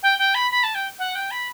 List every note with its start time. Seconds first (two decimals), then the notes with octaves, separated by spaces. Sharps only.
0.03 G5
0.19 G5
0.35 B5
0.51 B5
0.63 A5
0.75 G5
0.99 F#5
1.15 G5
1.31 B5